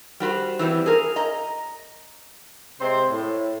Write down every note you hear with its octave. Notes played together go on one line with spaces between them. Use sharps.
G3 F#4 B4 C5
E3 G3 B3 C4
G#4 A#4
D#5 A#5
C3 G#3 C4 C5
A2